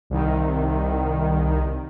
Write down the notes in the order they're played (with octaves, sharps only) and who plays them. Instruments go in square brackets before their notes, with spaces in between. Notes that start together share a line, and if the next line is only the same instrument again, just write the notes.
[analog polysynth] C2 D#3